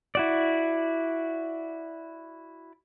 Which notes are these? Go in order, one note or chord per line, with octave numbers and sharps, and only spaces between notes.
E4 F#4 D5